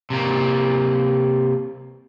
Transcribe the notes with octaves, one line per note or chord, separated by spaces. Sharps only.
C3 A#3